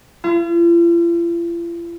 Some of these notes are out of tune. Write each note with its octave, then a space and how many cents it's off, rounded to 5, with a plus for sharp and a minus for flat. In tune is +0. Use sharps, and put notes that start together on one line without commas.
F4 -45